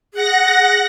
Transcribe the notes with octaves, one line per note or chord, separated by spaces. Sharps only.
G#4 F#5 A#6